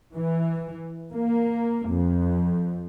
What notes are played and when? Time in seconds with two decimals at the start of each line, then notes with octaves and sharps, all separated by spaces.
0.16 E3
1.13 A#3
1.90 F2